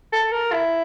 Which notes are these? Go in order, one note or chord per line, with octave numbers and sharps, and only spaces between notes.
A4
A#4
E4